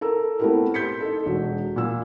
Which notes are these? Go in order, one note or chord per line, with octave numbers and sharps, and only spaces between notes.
A4 A#4 A#5 E6
A3 B3 C4 E4 G4 A#4
C6 G6 B6 C#7
D#4 A4
E1 F#4
A#2 E6